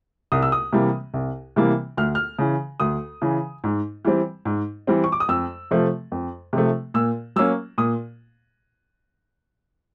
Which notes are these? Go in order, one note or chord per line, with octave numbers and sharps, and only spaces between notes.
C2 D#6
E6
D#6
C3 E3 G3 A#3
C2
C3 E3 G3 A#3
D2 F6
F6
C#3 E3
D2 D#6
C#3 E3
G#2
E3 G3 C4
G#2
E3 G3 C4
C#6
D6
D#6
F2 E6
C3 F3 A3
F2
C3 F3 A3
A#2 E6
F#3 A#3 C#4 E6
A#2 D#6